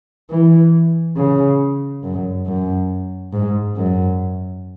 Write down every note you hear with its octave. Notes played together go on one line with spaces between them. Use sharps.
E3
C#3
F#2
F#2
G#2
F#2